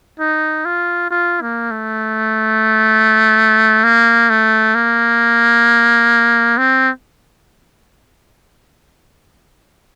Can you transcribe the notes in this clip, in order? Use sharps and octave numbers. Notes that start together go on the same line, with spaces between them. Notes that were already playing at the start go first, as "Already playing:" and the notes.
D#4
F4
F4
A#3
A3
A#3
A3
A#3
C4